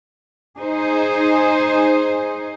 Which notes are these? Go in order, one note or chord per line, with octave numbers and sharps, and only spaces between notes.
D#4 G#4 C5